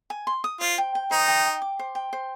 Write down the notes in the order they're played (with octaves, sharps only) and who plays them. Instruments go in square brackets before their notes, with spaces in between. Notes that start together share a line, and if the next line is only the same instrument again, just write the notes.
[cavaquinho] G#5
C6
D#6
[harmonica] F4 [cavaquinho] C5
[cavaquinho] G5
G5
[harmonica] D#4 [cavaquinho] C5
[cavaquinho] G5
G5
D6
C5
G5
C5